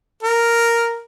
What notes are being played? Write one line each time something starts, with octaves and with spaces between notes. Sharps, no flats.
A#4